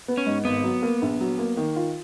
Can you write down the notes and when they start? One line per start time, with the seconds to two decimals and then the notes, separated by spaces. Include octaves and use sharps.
0.08 B3
0.17 C#4
0.26 G#2
0.45 G#1 B3
0.63 F#3
0.82 A#3
1.02 A#1
1.20 F#3
1.38 A#3
1.57 D#3
1.76 F4